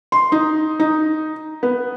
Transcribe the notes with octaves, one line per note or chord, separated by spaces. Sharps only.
C6
D#4
D#4
B3